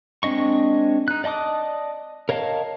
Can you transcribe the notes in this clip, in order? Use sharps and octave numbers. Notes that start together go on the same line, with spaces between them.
G#3 C4 D4 D#5 C#6
D#4 F#6
D5 D#5 A5 D6 D#6
A#4 C#5 D#5 F5 A5